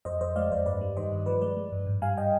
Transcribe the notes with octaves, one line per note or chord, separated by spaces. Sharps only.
F2 C5 D#5
F2 C5 D#5
G#3 D5 F5
F2 C5
G2 B4 D5
G3
D#3 C5 D#5
G2
F3 B4 D5
G#3 B4 D5
G#3
G2
G#2
G3 F5 G#5
D#5 G5